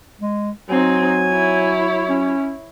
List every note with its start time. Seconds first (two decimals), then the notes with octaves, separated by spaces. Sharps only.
0.21 G#3
0.70 F#3 C4 D#4 G#5
1.29 E4 C#5
2.09 C#4